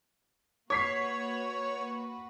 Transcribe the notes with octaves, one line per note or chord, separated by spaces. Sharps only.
A#3 F#4 B4 C#5 C#6 B6 C7